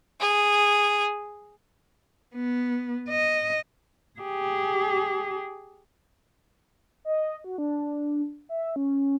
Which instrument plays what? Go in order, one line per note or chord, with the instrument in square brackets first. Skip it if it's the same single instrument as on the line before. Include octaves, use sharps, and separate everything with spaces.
[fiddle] G#4
[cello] B3
D#5
G4 G#4
[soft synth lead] D#5
F#4
D4
E5
C#4